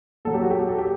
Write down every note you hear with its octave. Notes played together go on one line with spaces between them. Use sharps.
A#2 F#3 A4
G4
F#4
G4
A4
G4